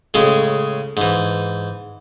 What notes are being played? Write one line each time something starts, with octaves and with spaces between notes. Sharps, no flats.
A2 C#3 G#3
G#2 E3